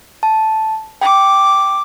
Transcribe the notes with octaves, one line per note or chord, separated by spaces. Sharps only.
A5
G5 D6